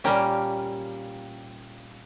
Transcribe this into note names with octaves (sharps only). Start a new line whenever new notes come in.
A#2 G3 A#3 C#4 G4